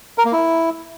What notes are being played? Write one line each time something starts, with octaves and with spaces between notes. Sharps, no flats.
A#4
A#3
E4